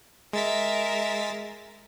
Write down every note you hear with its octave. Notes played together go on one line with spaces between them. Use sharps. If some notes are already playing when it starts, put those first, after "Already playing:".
G#3 A#4 E5 A6 B6